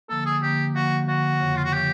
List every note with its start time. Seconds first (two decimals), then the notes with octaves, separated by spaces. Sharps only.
0.09 D3 F3 A#3 A4
0.26 G#4
0.42 D3 F3 A#3 G4
0.75 D3 F3 A#3 F#4
1.08 D3 F3 A#3 F#4
1.40 F2 C#3 F3
1.56 F4
1.65 F#4
1.73 C#3 F3 G4